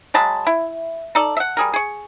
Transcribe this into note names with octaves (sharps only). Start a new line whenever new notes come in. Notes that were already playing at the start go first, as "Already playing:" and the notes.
F#3 G#3 A5 B5
E4
D#4 A4 D5
E5 F#5
G3 G#4 A#4
G#4 C#6